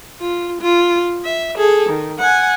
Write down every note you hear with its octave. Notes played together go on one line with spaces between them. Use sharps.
F4
F4
E5
G#4 A4
D#3
F#5 G#5